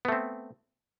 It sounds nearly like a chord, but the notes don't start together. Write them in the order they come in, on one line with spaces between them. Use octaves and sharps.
B3 A3 C4